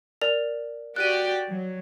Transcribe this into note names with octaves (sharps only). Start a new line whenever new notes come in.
A#4 D5 F7
F#4 G4 D5 F#6 D#7
F#3